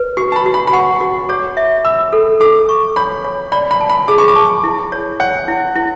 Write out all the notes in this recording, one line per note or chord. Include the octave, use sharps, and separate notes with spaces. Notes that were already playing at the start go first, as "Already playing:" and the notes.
Already playing: B4
F#4 C#6
A5
B5
F#4
B5
B5
F#5 C#6
F#4
C#5 D6
E5
B5 E6
A4
A4 D6
C#6
C#5 B5
C#5
D5 B5
B5
A5
B5
G#4 D6
C#6
D6
A5
E4
C#5
C#5 F#5
E4
E4